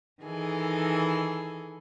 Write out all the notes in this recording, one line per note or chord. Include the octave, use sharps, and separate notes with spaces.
D#3 E3 G#4 A4